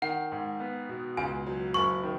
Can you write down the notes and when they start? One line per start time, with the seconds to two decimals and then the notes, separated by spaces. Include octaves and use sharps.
0.02 D#3 F#5
0.32 G#2
0.60 B3
0.89 B2
1.17 C#2 G#5
1.46 F#3
1.74 F#1 C#6
2.03 D#3